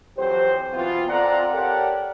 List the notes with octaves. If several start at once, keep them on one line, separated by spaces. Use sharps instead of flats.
F2 E3 F#3 G4 C5
B2 E3 B3 C4 F4
C4 F4 A4 D5 F#5 A#5
G4 A4 A#4 C#5 D5 F#5